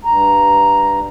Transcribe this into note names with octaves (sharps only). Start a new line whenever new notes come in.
G2 A#5